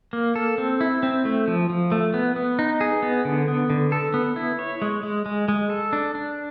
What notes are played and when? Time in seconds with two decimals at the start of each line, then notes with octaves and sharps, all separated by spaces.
0.13 A#3
0.36 A4
0.58 C4
0.81 E4
1.03 C4
1.25 A3
1.48 F3
1.70 F3
1.92 A3
2.14 B3
2.36 B3
2.59 D#4
2.81 G#4
3.03 B3
3.25 D3
3.48 B3
3.70 D3
3.92 A4
4.14 B3
4.36 E4
4.59 C#5
4.82 G#3
5.03 G#3
5.26 G#3
5.48 G#3
5.70 A4
5.93 D4
6.15 D4